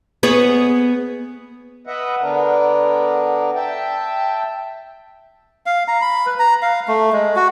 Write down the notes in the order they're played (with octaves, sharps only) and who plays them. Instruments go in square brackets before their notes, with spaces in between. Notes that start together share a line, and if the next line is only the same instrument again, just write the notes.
[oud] B3 G#4 C#5
[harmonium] B4 D#5 E5 F#5
D3 B3 D4 A#4
E5 G5 A5
[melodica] F5
A#5
B5
B4
A#5
F5
A3
G#3
F#4